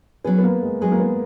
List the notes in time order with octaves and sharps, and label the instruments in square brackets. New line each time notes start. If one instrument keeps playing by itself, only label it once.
[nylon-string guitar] F#3 C#4 G#4 [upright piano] B3
[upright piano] B3
A#3
G#3
[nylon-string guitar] F#3 C#4 G#4 [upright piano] G#3
[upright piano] A#3
B3